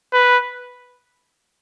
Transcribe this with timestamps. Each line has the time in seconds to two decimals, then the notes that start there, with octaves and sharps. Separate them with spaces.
0.13 B4